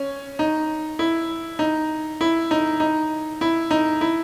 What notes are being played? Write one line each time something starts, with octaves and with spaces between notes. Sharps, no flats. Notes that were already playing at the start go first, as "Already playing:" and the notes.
Already playing: C#4
D#4
E4
D#4
E4
D#4
D#4
E4
D#4
E4